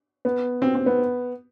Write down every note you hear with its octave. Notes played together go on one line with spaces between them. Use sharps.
B3
C4
C4
B3